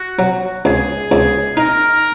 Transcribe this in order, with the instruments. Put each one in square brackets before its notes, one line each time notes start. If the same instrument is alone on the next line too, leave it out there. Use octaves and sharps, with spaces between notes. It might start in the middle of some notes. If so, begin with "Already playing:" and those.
Already playing: [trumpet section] F#4
[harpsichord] F#3
[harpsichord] C#2 [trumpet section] G#4
[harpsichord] C#2
[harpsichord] D#4 [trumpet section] A#4